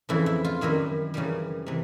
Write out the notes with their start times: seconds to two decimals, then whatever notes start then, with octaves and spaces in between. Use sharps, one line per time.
0.09 F2 C#3 E3 E4
0.26 E4
0.44 F4
0.61 F#2 D#3 G3 E4
1.14 F#2 C#3 E3 G3
1.66 C3 E3